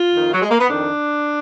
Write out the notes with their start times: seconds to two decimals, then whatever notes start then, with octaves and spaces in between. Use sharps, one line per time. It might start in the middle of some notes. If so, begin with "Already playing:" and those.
Already playing: F4
0.13 F2 D#3
0.33 F#3
0.42 G#3
0.51 A#3
0.60 B3
0.69 F2 D#3 D4